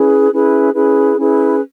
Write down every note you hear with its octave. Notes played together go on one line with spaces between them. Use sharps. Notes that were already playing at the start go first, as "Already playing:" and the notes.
Already playing: C#4 E4 G#4 B4
C#4 E4 G#4 B4
C#4 E4 G#4 B4
C#4 E4 G#4 B4